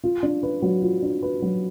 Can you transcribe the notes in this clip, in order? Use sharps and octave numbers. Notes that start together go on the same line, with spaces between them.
F4
D4
B4
F#3
F4
D4
B4
F#3